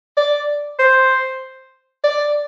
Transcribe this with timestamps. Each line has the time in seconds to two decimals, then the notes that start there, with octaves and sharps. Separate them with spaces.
0.17 D5
0.79 C5
2.04 D5